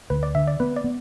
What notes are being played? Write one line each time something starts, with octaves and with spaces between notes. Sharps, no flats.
D2 B4
D5
D3 E5
D5
B3 B4
D5
B3